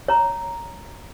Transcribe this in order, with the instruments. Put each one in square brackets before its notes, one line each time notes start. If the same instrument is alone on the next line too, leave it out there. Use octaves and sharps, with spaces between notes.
[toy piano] C#5 A#5